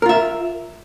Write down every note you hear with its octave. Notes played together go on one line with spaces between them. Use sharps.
F4 A#4 E5